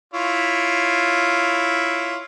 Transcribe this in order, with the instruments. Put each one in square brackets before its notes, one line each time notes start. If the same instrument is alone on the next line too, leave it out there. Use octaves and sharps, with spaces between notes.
[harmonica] E4 F4 C#5